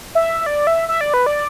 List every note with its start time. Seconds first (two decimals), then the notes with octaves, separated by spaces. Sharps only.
0.15 E5
0.46 D5
0.67 E5
0.89 E5
1.01 D5
1.14 B4
1.26 D5